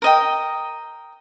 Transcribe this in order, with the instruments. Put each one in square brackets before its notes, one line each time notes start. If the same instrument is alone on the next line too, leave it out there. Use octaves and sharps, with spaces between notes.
[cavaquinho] A#4 D#5 G5